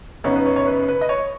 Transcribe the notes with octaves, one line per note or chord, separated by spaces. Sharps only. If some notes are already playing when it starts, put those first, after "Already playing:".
F#2 C#3 B3 D#4 C#5
B4
C#5
C#5
B4
B4
D#5
C#5